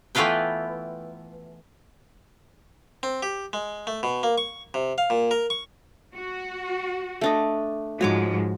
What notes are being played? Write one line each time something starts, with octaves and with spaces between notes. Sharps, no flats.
E3 A3 B3 F4 B4 G5
C4
G4
G#3
A3
B2
A#3
C#6
C3
F5
A#2
A#4
C#6
F#4
A3 D4 D#5
G#2 F3 G#3 F#4 C#5 D6